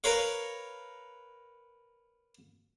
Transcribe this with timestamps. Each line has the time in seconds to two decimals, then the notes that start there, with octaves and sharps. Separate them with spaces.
0.04 A#4 B4 C#5 F5